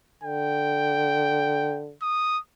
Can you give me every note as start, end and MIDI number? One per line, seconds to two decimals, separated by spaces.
0.24 1.93 50
0.24 1.81 79
2.02 2.39 87